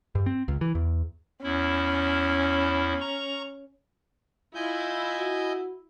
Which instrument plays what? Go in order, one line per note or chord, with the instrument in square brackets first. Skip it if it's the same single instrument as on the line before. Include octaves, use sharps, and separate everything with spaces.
[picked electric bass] G2
C4
C#2
E3
E2
[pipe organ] E2 E4 [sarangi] C#4
[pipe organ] A#5 C#6
[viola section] E4 [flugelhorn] F4 [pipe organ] D#5 G#5 G6
[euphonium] F#4